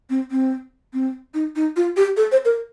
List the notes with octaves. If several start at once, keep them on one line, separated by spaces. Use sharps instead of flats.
C4
C4
C4
D#4
D#4
F4
G4
A4
C5
A#4